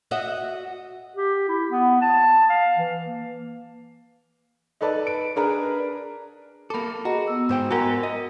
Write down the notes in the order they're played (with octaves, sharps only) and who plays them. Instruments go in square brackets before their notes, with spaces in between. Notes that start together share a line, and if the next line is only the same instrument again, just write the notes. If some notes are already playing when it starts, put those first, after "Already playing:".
[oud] F#4 D#5 E5
[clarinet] G4
E4
B3
A5
F5
E3
A#3
[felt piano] D#4 A4 B4 D5 A5
D7
D4 G#4 A#4 B4 A#5
[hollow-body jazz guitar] A#3 A4 [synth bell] B5 D6
[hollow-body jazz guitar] F#4 [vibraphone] G#4 D#5 A#5
[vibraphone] B3 E6
[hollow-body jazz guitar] G#2 C5 G5
[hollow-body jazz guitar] F#4 A#5 [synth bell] A#4 F#5 G#5
[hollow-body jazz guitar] D#5